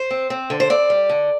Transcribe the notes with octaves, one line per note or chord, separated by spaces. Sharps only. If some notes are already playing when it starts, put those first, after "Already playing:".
Already playing: C5
C4
C4
D3
C5
C4 D5
G3
D3